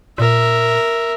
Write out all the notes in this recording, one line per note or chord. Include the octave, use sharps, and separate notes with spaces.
A#2 A#4 E5